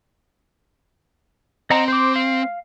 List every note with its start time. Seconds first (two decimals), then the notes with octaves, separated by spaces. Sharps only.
1.70 C4 D#5 F#5 A#5
1.88 C5 D6
2.16 F5